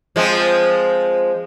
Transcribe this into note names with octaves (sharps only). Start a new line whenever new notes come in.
F3 G#3 C4